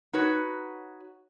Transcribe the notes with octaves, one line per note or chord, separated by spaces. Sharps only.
D#4 F#4 B4 C#5